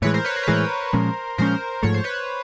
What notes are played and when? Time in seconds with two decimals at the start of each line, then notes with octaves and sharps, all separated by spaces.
0.02 A2 E3 G#3 B4 C#5
0.14 A#4 C5
0.25 B4 C#5
0.36 A#4 C5
0.43 B4
0.47 A2 E3 G#3 A#4 C5
0.93 A#2 F3 G#3 C#4
1.38 A#2 F3 G#3 C#4 A#4 C5
1.83 G#2 F3 A3 C#5
1.94 C5
2.04 B4 C#5